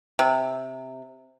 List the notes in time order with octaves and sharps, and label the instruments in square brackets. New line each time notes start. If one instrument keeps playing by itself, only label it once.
[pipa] C3